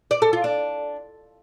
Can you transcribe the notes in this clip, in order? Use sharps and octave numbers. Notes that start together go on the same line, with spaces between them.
D5
A4
F4
D4